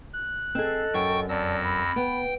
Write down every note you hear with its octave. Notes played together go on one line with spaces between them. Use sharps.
F#6
C4 G#4 A4 D#5
F#2 G5 C#6
F2 D5 A5 E6 A#6
B5
B3 G5